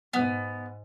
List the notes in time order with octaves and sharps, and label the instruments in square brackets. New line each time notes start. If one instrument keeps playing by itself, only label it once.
[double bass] G#2 [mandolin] B3